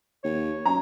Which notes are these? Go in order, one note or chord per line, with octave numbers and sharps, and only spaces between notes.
D#2 C#5
F#2 A#5